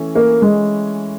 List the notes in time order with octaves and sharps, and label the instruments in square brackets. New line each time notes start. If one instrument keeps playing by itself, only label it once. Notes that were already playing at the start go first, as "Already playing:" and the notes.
Already playing: [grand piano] E3 A3 C#4
[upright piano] A#3
G#3